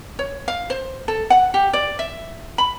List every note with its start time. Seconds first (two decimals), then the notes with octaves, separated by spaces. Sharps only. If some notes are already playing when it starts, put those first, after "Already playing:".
0.19 C#5
0.48 F5
0.70 C5
1.08 A4
1.30 F#5
1.54 G4
1.73 D5
1.99 E5
2.58 B5